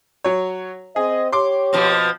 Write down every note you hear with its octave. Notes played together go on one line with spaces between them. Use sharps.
F#3 C#5
C4 G#4 C5 D#5
G4 C#5 C6 D6
B2 F3 C4